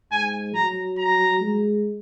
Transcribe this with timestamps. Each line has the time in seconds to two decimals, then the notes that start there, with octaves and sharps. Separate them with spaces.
0.11 G#2 G#5
0.54 F#3 A#5
0.98 A#5
1.41 G#3